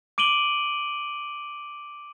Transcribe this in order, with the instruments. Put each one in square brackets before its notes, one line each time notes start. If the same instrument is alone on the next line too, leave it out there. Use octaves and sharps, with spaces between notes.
[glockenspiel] D6 D7 D#7 F#7 G7